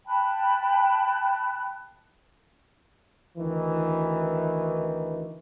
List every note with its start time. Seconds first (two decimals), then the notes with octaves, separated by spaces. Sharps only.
0.06 G5 A5 B5 F#6
3.38 D2 D#3 E3